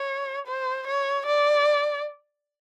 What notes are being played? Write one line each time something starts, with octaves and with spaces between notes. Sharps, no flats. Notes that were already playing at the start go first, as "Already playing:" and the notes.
Already playing: C#5
C5
C#5
D5